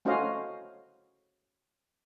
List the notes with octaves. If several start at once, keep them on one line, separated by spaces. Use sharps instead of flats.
A3 C#4 F#4 C5 D#5 F5